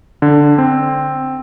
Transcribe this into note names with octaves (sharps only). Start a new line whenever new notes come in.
D3
C4